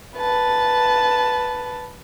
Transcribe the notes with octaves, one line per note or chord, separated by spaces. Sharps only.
B4 A5